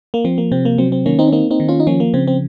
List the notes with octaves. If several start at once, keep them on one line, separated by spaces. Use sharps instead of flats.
A#3
F3 C4
A#3
C3 C4
A#3
F#3 C4
C4
D#3 A#3 C#4
C4 D#4
C#4
A#3 C4 D#4
C4 D#4
D#3
C#4 F4
D#4
F3 A#3 C#4
A#3
C#3 C4
C4